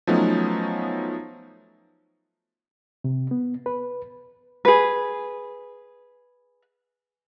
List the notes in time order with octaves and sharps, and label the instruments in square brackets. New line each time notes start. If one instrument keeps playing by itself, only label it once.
[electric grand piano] F3 F#3 A3 B3 C#4 D#4
[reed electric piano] C3
B3
B4
[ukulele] G#4 B4